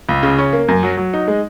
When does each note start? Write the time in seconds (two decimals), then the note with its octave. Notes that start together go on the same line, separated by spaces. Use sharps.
0.09 C#2
0.23 C#3
0.38 C#4
0.53 A#3
0.68 F#2
0.83 F#3
0.97 F#3
1.13 D#4
1.28 G#3